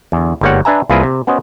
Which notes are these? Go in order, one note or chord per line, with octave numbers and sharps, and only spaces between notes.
E2 D3
G1 G#2 G3 A#3 C#5 F#5
D4 B4 E5 G#5 A#5
C2 A#3 E4 F4 G#4 B4
C3
B3 C#4 F#4 C5 D#5